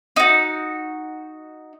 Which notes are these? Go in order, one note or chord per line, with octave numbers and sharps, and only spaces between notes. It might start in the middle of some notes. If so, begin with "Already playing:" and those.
D#4 F#4